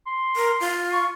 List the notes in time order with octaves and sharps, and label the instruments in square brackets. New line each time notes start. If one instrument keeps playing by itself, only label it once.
[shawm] C6
[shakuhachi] A#4
F4
[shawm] C#6